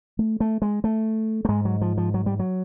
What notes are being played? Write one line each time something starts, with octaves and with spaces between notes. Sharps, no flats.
A3
A3
G#3
A3
A3
G#2 G#3
F#3
F3
F3
F#3
G3
F#3